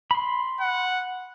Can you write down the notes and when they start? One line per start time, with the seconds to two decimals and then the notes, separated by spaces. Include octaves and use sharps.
0.11 B5 C6
0.61 F#5